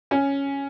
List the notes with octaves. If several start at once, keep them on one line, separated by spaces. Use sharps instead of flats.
C#4